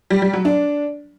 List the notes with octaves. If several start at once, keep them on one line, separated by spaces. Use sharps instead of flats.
G3
G3
F#3
D4